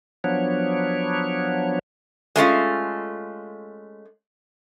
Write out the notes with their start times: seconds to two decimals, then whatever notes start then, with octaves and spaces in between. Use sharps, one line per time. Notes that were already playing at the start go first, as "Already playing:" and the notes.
0.24 F3 F#3 B3 D4 C#5
2.36 G#3 A3 C#4 F4